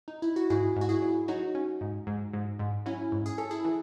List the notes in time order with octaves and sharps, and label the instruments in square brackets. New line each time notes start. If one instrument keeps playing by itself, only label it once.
[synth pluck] D#4
E4
F#4
[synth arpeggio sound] G#2 [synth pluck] E4 G#4
[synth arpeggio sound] G#2
[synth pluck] F#4
E4 G#4
[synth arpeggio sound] F#3
[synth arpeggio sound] F#3 [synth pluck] D#4 F#4
[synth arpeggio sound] C#4
G#2
G#2
G#2
G#2
[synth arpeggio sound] F#3 [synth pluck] C#4 E4
[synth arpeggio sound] G#2
[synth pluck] G#4
[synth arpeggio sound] C#4 [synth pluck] A4
[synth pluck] E4 G#4
[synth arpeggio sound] E3